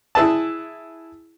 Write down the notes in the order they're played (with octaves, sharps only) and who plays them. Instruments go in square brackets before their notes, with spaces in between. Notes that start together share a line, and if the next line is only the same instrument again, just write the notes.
[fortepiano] E4 G#4 B4 E5 A5